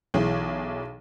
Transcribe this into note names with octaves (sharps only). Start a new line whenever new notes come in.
B1 E3 G#4